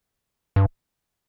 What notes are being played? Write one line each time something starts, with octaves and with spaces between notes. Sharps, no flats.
G2